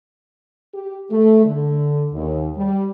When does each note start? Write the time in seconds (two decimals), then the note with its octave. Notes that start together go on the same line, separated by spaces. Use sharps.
0.75 G4
1.11 A3
1.45 D3
2.13 D#2
2.57 G3